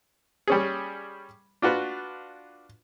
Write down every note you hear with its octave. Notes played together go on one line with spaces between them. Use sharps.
G3 C#4 G#4
D4 F4 F#4 B4